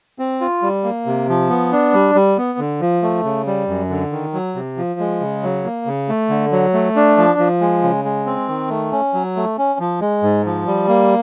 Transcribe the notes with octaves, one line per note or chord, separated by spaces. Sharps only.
C4
F4
G3
A#3
C3
F3
B3
D4
G3
G3
B3
D3
F3
A3
C#3
G3
F#2
D3
D#3
F#3
C3
F3
G#3
C#3
F#3
A#3
C#3
A3
D3
F#3
A3
D4
F3
F3
G#3
C#3
G#3
C4
D#3
A3
C#4
F#3
A3
C#4
F3
G#3
G#2
F3
G3
A#3